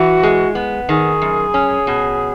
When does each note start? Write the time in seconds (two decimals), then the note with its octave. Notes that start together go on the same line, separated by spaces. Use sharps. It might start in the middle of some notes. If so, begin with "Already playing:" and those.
Already playing: E3 F#4
0.23 G#3
0.55 B3
0.89 D#3 G#4
1.22 F#2
1.54 C#4
1.87 B2